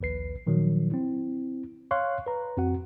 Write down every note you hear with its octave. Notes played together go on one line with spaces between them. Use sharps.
A#1 D#2 B4 C7
A#2 D#3 F3 F#3
C4 E4
C#5 F5 C6 C#6 F#6
B4 A#5
F2 C4 F#4 F#5